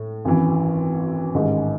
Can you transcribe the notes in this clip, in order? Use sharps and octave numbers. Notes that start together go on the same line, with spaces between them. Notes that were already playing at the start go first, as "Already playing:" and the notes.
Already playing: A2
G#1 F#2 E3
A1 G#2 D#3